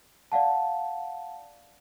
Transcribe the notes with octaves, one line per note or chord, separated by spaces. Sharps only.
D5 F5 F#5 A5